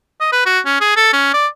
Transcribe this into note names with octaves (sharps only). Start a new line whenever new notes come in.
D#5
B4
F#4
C#4
G#4
A4
C#4
D5